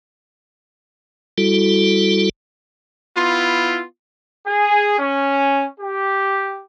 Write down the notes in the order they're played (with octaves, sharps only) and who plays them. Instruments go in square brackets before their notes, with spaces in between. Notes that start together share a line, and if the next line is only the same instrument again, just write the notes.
[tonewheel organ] G3 E4 F#4 A4
[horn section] B3 E4 F4
[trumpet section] G#4
C#4
G4